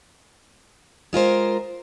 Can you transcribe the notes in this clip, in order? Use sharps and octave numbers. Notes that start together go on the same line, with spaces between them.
G#3 F4 A#4 C5